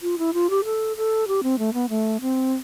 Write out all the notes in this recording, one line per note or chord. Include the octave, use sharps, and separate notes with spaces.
F4
E4
F4
G4
A4
A4
G4
C4
A3
B3
A3
C4